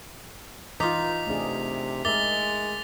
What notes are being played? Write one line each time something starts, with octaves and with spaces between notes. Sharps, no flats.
E3 D#4 F4 D6 B6
C3 A3 D4 G#4
G#3 A#4 E5 D6 A6 G7